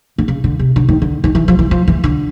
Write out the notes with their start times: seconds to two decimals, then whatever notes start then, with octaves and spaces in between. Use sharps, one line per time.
0.18 D3
0.28 C#3
0.44 D3
0.59 C3
0.76 D3
0.89 D#3
1.02 D3
1.24 D#3
1.35 E3
1.48 F3
1.59 E3
1.71 F3
1.88 E3
2.04 D3